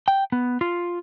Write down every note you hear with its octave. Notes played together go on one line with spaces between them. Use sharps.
G5
B3
F4